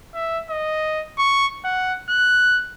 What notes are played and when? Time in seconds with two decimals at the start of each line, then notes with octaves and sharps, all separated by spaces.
0.14 E5
0.50 D#5
1.18 C#6
1.65 F#5
2.09 F#6